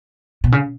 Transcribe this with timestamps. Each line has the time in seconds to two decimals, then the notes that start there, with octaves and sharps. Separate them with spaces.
0.44 B2
0.52 C#3